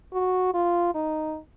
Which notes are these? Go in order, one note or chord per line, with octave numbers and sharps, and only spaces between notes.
F#4
F4
D#4